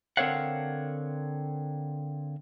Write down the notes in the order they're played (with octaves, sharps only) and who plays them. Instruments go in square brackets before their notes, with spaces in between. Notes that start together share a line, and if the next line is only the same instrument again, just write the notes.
[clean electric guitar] D3 C4 A#4 C#5 F5 F#5